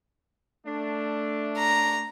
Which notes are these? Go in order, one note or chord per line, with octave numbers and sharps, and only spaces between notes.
A3 D4
A#5